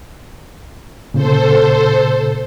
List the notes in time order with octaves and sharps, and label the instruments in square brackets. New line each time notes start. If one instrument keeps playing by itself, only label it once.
[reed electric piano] A#2 C#3 [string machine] A4 C5